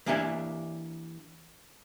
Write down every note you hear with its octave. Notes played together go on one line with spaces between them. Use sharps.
E3 A#3 D4 G4 E5 G#5